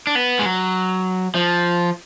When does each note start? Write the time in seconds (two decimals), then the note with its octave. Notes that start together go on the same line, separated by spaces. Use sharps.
0.07 D4
0.15 B3
0.39 G#3
0.46 F#3
1.35 F3